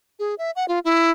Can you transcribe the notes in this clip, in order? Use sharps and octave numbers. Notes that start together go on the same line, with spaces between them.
G#4
E5
F#5
F4
E4